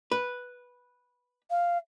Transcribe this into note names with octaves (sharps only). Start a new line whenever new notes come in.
B4
F5